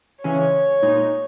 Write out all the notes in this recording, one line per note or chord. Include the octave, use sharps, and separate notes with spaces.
C#3 E3 G#3 C#4 C#5
A#2 G#3 D#4